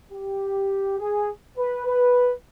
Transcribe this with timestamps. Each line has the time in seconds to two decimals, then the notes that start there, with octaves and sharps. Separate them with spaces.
0.11 G4
0.99 G#4
1.57 B4
1.86 B4